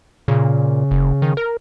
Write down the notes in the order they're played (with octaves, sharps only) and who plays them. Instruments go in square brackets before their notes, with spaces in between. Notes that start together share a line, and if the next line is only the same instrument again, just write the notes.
[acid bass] A#2 [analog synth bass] C#3
[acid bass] F#1
D#3
A#4